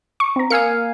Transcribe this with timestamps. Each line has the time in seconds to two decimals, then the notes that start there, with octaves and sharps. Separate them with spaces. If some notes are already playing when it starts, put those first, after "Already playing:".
0.20 C#6
0.36 C4 A#5
0.50 A#3 F5 G#5 D#6 E6 C#7